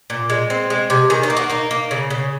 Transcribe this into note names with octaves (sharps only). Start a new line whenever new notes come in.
A#2
G#3
C4
G#3
C3
D#3 G#4
D#4
A#3
F#4
A#3 D#4
A#3
C#3
C#3